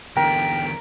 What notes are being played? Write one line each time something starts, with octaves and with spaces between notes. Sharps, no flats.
E2 D3 A#4 G5 B6 D7